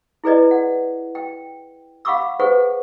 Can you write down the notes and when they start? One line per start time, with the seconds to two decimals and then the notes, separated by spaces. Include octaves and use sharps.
0.24 E4 G#4 B4 D5 D#5
0.51 F#5
1.15 G5
2.05 F5 F#5 B5 C#6 D6 E6
2.40 G#4 B4 C5 F#5 C#6